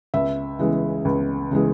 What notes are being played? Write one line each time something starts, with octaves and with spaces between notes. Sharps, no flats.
C#2 E5
C#3 E3 G#3
C#2
C#3 E3 G#3